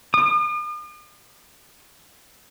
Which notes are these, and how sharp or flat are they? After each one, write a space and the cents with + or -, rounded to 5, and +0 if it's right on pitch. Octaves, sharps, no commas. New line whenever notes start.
D#6 -45